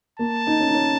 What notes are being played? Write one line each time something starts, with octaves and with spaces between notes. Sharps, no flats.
A#3 A5
D#4
C#4
D#4
C#4